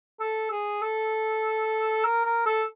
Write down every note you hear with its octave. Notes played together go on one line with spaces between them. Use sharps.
A4
G#4
A4
A#4
A#4
A4